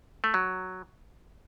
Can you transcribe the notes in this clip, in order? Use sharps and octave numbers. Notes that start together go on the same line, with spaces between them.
A3
F#3